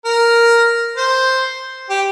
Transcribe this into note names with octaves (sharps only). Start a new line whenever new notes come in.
A#4
C5
G4